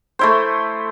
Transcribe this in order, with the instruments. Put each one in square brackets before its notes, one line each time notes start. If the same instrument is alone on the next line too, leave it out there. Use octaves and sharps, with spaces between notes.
[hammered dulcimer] A3 E4 C5